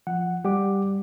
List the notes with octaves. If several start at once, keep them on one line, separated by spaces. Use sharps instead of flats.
F3 F#5
G3 G4 F#5 D6